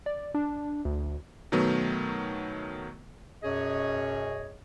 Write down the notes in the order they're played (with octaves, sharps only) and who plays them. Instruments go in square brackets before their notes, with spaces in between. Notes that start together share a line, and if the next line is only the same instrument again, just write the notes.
[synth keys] D5
D4
D2
[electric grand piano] B2 D#3 F#3 A3 B3
[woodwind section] F#2 B2 C#4 G#4 C#5 D#5